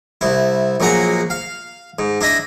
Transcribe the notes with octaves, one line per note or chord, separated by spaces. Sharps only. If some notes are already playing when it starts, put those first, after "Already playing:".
C2 E4
A#1 F#3 A#3 G#4 F#5
F5
G#2
D4 E4 D#5 B5